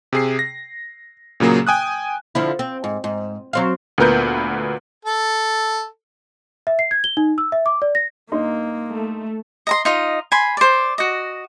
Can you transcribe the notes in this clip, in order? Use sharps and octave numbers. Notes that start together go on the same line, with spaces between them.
C3 G#4 C7
A#6
A#2 C#3 F#3 A#3 G#4
G5 G#5 D#6 F#6
D3 F3 E4
C4
G#2
G#2
F#3 C4 F5
D2 A#2 B3 A#4 B4 G6
A4
E5
C7
G#6
G7
D#4
E6
E5
D6
D5
A#6
G2 A#3 D#4 C6
A3
D#5 A#5 C6
D#4 F4 D#5
G#5 B5 C6
C5 D5
F#4 D#5